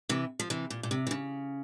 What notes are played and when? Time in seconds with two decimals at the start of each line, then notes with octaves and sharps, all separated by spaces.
0.09 C3 E3
0.39 F3
0.50 C3 E3
0.70 A#2
0.83 A#2
0.91 C3
1.07 E3
1.11 C#3